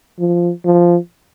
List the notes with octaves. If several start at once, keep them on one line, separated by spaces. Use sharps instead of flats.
F3
F3